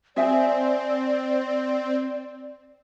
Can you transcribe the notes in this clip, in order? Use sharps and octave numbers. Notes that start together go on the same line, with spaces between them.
C4 G#4 D5 E5 G#5